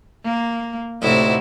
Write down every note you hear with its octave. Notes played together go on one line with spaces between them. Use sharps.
A#3
D2 A2 C3 D#4 E4 F#4